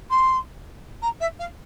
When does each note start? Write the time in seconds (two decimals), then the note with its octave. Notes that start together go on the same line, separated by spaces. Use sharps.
0.10 C6
1.02 A#5
1.20 E5
1.39 F5